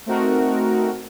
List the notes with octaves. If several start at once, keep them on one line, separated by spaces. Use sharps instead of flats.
A3 C4 D#4 F#4 A#4